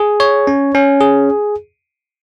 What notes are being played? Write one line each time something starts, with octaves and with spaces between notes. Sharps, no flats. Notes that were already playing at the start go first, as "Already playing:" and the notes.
Already playing: G#4
C#5
C#4
C#4
G#4